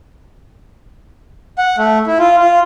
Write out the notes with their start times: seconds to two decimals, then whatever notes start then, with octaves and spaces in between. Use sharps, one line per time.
1.58 F#5
1.78 A3
2.07 E4
2.19 F4
2.40 F4